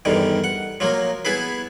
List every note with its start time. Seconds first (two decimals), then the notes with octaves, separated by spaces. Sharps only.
0.05 E2 G2 D3 D#3
0.44 F#5
0.80 F3 F#3 A#3
1.25 B3 E4 G#4 B4